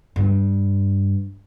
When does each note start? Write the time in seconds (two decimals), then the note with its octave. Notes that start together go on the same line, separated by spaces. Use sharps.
0.16 G2